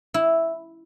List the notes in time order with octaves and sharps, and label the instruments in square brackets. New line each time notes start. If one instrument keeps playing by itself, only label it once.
[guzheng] E4